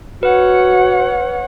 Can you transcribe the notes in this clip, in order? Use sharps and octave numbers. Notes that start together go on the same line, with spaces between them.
F#4 B4 C#5 F#5